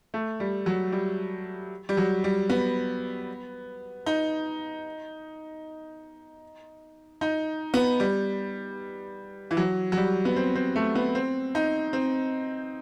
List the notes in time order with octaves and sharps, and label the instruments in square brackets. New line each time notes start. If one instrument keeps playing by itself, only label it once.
[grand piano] A3
G3
F#3
G3
G3
F#3
G3
B3
D#4
D#4
B3
G3
E3
F#3
F#3
G3
B3
C4
C4
A3
B3
C4
D#4
C4